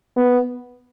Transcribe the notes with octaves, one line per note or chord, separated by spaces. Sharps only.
B3